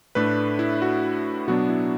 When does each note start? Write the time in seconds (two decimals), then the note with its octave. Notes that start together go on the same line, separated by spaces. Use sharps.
0.15 A2 A3 D4 B4
0.59 E4
0.82 F#4
1.48 B2 F#3 B3 D4 F#4
1.69 E4